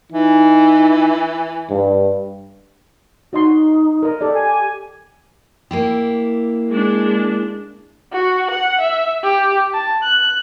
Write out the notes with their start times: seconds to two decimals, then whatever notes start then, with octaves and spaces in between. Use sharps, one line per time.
0.12 E3 D#4
1.70 G2
3.33 D#4 F#4 D#5 C6
4.03 A#4 D#5
4.21 G4 A4 D5
4.35 G#5
5.71 A#3 E4 G4
6.69 G#3 D4
8.13 F#4
8.51 F#5
8.81 E5
9.24 G4
9.74 A5
10.03 F#6